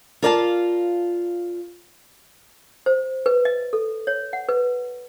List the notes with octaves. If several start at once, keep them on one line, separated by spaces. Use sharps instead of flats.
F4 A#4 D5 F5 G5 A5
C5
B4
D#5
A4
C#5
F#5
B4